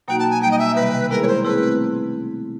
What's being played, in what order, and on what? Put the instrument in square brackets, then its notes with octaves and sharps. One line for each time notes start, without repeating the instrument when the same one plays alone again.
[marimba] B2 F#3 A#3 D#4 F#4 [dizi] G5
[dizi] A5
G#5
[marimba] G3 A#3 D#4 [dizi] G5
[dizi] D#5
E5
[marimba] C3 D#3 G3 [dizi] B4
[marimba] G#3 B3 E4 G#4 [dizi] A#4
[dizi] C#5
C5
[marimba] A3 C4 E4 G#4 [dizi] B4